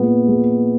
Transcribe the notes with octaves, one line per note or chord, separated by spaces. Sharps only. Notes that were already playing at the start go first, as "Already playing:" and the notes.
Already playing: A#2 G#3 B3
G#3